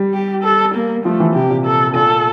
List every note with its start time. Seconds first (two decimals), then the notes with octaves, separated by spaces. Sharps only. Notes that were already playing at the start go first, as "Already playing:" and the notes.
Already playing: G3
0.14 G4
0.44 A4
0.75 A#3
1.05 F3 A3
1.20 E3
1.35 C3 G4
1.50 A#2
1.66 A4
1.95 A#2 A4